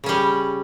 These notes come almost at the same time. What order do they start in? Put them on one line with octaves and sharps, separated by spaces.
C#3 C#4 G3